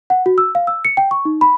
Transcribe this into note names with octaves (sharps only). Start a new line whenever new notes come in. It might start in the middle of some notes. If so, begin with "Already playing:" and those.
F#5
F#4
E6
F5
E6
C#7
G5
C#6
D#4
B5